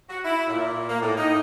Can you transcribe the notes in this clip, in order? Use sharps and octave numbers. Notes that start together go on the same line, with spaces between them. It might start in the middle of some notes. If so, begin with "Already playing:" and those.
F#4
E4
A#2
A#3
A2
D#4